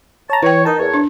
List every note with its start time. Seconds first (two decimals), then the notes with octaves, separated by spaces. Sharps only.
0.30 C#5 A5 A#5
0.43 E3 B4 C#5 G5
0.65 D#4 A#4 A5
0.79 E2 C#5
0.94 D4